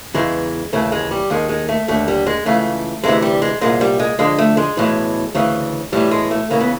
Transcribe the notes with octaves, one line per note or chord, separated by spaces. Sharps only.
E2 C#3 E3 G#3
D#2 C#3 E3 A3
G#3
G3
D#2 D#3 G#3
G#3
A3
D#2 D3 A3
G3
G#3
C#2 C#3 E3 A3
D2 C3 E3 G#3
G3
G#3
C2 A#2 G#3
G3
G#3
F2 D3 G#3
A3
G#3
B1 A2 E3
D2 C#3 E3
B1 A2 E3 G3
G#3
A3
C#2 C#3 E3 A#3
B3